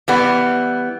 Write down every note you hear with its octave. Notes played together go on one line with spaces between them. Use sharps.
E3 G3 B3